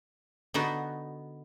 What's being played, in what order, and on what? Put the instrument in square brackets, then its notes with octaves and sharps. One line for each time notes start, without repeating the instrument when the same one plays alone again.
[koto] D3 B3 D#4 F#4